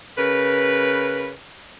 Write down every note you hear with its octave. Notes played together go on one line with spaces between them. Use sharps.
C#3 A#4 B4